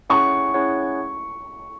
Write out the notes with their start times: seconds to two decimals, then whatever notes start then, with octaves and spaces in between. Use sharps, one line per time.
0.09 C#4 E4 G#4 C#5 F#5 C#6
0.54 C#4 E4 G#4 C#5 F#5